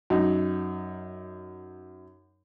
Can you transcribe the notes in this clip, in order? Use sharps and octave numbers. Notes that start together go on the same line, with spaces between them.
F#2 D#4